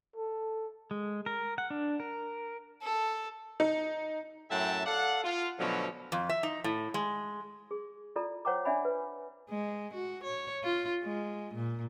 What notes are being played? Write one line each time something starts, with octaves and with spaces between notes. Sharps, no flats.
A4
G#3
A#4
F#5
D4
A#4
A4
D#4
F#2 A2 E5 F#5 G5 A5
A4 D5 F5 F#5
F4
B2 D3 F3 F#3 A3 C#4
F2
E5
D#4
A2
G#3
G#4
E4 F4 A4 D5 A#5
C5 C#5 F#5 G5 A#5 D6
D4 D5 E5 F#5 G#5 B5
B4
G#3
F#4
C#5
F4
G#3
A#2